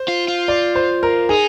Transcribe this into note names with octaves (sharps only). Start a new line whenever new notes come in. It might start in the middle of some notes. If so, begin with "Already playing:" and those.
Already playing: C5
F4
F4
D5
C5
A#4
D#4 G#4